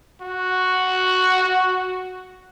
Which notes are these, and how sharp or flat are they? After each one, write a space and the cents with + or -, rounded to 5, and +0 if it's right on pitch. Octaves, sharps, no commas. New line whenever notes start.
F#4 +0